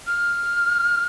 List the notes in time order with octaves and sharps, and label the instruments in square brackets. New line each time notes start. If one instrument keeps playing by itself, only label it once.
[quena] F6